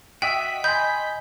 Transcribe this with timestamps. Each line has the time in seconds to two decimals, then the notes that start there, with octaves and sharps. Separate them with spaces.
0.22 F#4 D#5 E5 G5 B6
0.64 D#5 G#5 B5 C6 G6